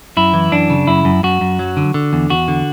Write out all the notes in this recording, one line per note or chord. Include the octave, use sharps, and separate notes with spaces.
F#2 E4
E3
F#2 D4
C#3
F#2 E4
F#2
F#2 F#4
F#2
F#3
D3
D3
E2
E2 F#4
D3